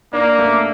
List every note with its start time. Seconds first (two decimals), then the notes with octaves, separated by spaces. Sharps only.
0.13 A#3 D4
0.39 A3